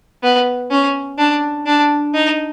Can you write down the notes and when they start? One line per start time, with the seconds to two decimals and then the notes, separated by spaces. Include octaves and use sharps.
0.23 B3
0.71 C#4
1.18 D4
1.66 D4
2.14 D#4